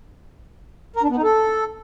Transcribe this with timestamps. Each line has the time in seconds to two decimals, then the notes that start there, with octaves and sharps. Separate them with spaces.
0.96 A#4
1.03 D4
1.10 B3
1.16 D#4
1.23 A4